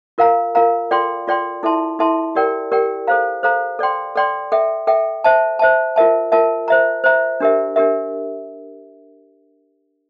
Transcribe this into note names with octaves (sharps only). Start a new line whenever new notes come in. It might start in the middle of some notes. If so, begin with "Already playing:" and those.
F4 A#4 F5 A#5
F4 A#4 F5 A#5
F4 A4 D5 G5 C6
F4 A4 D5 G5 C6
E4 A4 E5 A5 C6
E4 A4 E5 A5 C6
G4 A#4 D5 G5
G4 A#4 D5 G5
A4 C5 F5 A#5
A4 C5 F5 A#5
A4 D5 G5 C6
A4 D5 G5 C6
A4 E5 G5
A4 E5 G5
C5 E5 A5
C5 E5 A5
F4 A#4 E5 A5
F4 A#4 E5 A5
C5 E5 A#5
C5 E5 A#5
D4 G4 A#4 E5
D4 G4 A#4 E5